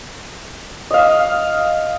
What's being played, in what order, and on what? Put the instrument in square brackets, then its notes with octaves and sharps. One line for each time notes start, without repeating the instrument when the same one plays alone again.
[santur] D#5 F5